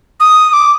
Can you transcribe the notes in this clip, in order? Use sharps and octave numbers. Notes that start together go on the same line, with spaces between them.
D#6
D6